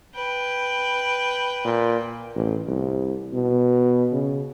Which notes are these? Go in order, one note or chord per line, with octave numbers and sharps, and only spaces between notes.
B4 G5
A#2
A1
C2
B2
C#3